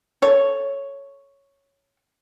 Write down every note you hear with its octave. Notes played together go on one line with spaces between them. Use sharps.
A4 C#5